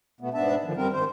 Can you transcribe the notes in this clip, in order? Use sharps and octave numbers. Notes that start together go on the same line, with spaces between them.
B2 A3 B3
G#2 B3 D4 E5 A5
D3 D#3 F3
F#2 G3 C4 A#4
G#2 D#3 C5